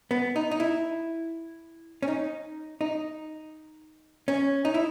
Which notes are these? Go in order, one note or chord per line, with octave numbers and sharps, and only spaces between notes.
B3
D#4
D#4
E4
C#4
D#4
D#4
C#4
D#4
E4